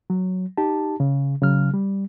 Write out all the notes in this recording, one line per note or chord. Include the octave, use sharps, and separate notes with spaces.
F#3
D#4 G4 A5
C#3
C#3 F#3 F6
G3